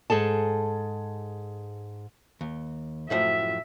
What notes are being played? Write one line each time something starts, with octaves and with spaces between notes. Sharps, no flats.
G#2 G#4 A4 A5
D#2
F#2 A2 F3 E5